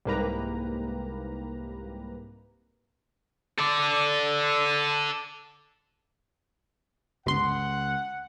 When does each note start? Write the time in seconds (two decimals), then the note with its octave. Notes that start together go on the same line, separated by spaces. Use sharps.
0.05 C2 G#2 A#3 G4 B4 A#5
3.59 A4 D5
7.26 G1 C#2 F#5 C6